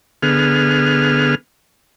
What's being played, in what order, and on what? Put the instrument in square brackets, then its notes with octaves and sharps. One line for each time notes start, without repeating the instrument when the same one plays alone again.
[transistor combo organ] D3 B3 G#4 F6